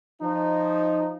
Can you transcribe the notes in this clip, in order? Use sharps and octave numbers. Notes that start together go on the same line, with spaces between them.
F3 D#4